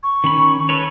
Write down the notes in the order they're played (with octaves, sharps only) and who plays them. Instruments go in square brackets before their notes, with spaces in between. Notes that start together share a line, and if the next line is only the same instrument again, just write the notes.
[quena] C#6
[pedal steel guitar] D#3 C#4 B5
A4 B4 C#5